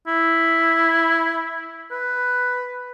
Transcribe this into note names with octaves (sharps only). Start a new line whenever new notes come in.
E4
B4